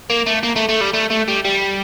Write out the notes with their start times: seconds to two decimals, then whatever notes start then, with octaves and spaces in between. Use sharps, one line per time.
0.10 A#3
0.26 A3
0.43 A#3
0.56 A3
0.69 A3
0.81 G3
0.94 A3
1.11 A3
1.28 G3
1.45 G3